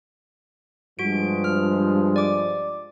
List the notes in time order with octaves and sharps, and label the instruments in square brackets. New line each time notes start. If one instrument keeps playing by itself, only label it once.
[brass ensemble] G2 F3 G#3 [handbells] F#4 D7
[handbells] F6
D5 D6